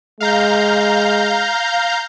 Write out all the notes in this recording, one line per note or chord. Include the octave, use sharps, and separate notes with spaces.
G#3 F5 A#5 G6